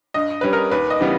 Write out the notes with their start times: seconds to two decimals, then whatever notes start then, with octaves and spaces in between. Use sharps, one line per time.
0.14 G2 D#5
0.41 G3 C#4 B4
0.53 A#4
0.71 D#2 B4
0.90 D#5
1.00 C#3 E3 G3 B3